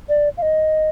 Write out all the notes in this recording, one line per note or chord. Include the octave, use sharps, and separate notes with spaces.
D5
F5
D#5